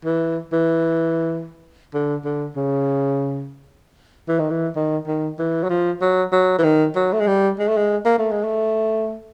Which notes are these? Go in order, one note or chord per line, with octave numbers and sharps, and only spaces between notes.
E3
E3
D3
D3
C#3
E3
D#3
E3
D#3
D#3
E3
F#3
F3
F#3
F#3
E3
D#3
F#3
A3
G#3
G3
G#3
A3
G#3
A#3
A3
G#3
A3